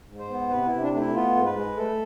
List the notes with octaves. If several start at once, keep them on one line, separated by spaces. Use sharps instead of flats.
G#2
C5
B3
C3 B4
E4
C3
D4
A3 D4
E4
B3 F4
G#2
B4
G#3
A3 A4